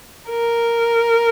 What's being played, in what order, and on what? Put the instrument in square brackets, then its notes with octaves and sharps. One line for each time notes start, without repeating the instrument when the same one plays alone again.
[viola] A#4